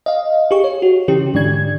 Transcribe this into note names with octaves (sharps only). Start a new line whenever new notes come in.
D#5 F5
G4 G#4 C#6
C#5
F#4
C#3 E3 C#4 G4
G#2 D3 D5 G#6